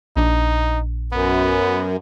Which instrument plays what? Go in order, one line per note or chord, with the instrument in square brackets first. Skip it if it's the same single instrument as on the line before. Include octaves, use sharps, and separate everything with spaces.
[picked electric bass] A#1 D4 [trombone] D#4
[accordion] F#2 [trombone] B3